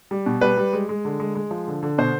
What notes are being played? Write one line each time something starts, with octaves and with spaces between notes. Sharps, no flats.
G3
B2
G3 B4
G3
G#3
G#3
D3
G#3
G#3
F3
D3
D3
B2 C5